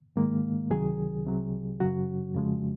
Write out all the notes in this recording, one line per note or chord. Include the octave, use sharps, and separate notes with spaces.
G#2 D#3 G#3 A#3
C#2 C3 D#3 F#3 G#4
C2 C3 F#3
F#2 C#3 F#3 F#4
F2 C#3 F3 G#3